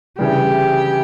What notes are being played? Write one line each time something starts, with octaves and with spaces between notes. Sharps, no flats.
D2 C#3 E3 G3 G4